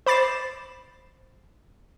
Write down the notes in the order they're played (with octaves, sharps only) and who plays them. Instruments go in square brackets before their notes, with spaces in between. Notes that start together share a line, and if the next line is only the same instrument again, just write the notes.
[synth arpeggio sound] C5 B5 D6 A6 C7 E7